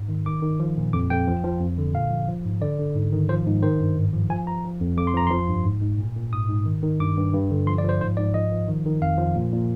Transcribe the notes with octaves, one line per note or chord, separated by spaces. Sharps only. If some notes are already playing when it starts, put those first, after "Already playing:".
Already playing: G#2
D#3
D#3 D6
D#3
F3
A#2
F2 D6
F2 G5
F3
F3
F2
D3
A#2 F5
F3
F3
G#2
D3 D5
D3
G#2
D#3
F3 C5
G#2
D#3 C5
G2
G#2
F3
F3 G#5
F3 A#5
F3
F2
F2 D6
C6
F3 A#5
F3 C6
G2
G#2
G#2
A#2
A#2
G#2 D#6
G#2
D#3
D#3
G2 D6
G2
G2
D3
F3 C6
D5
F3
C5
G#2 C5
G#2 D5
F3 D#5
F3
D#3
D#3
F2 F5
F3
A#2
A#2